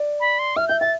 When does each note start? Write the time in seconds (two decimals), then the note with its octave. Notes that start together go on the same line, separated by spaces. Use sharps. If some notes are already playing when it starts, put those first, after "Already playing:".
Already playing: D5
0.20 B5
0.39 C6
0.56 E5 F6
0.68 E5 G6
0.81 E5 A6